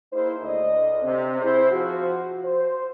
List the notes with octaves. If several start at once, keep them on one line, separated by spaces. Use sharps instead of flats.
A#3 D#4 E4 G#4 C5
D2 D5 D#5
C3 C4
E4 G#4 C5
F3 F#4
C5